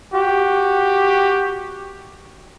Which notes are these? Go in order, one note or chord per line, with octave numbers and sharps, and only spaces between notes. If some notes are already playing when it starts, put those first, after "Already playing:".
F#4 G4